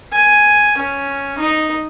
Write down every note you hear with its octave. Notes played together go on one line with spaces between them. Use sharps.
G#5
C#4
D#4